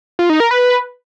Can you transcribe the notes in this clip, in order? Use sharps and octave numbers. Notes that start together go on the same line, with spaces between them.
F4
D#4
A#4
B4